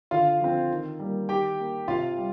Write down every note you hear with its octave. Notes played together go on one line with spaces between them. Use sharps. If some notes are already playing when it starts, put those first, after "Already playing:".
D3 F4 F5
F3 C4
D#3
G3 A#3
D#3 G4 G5
A#3
C3 F4 F5
G3